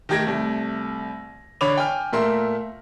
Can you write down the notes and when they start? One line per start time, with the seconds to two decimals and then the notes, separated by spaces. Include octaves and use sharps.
0.09 D#3 A3 G4 G#6 A#6 D7
0.27 C2 A3
1.61 D3 C#5 B5 D6 F7
1.77 G5 G#5 F6
2.13 A#2 A3 A#4 E5 C6